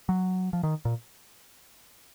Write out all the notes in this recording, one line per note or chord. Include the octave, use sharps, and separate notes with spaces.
F#3
F3
D#3
A#2